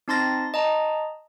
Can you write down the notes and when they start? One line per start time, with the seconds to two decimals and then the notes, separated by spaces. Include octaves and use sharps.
0.08 C4 D#4 A5 C6 A6 A#6
0.54 D#5 A5 A#5